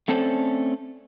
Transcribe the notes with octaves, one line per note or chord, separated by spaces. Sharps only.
A3 C4 C#4 A4 C5 D5